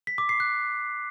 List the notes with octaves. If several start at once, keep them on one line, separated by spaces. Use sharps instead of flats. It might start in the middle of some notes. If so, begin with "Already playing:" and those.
B6
D6
C7
F#6